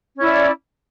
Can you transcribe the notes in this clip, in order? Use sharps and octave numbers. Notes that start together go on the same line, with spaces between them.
C#4 E4 D5